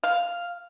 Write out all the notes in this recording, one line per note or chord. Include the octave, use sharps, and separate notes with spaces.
F5